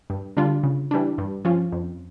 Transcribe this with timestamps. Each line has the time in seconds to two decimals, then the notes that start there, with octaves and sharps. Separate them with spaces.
0.10 G2
0.37 D3 G3 D4 F4
0.63 C#3
0.91 E3 G3 D4
1.18 G2
1.45 F3 C#4 F4
1.72 F2